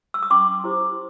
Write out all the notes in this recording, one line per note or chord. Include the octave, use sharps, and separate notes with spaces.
E6
D#6
C#4 C6 D6
E4 G4 C5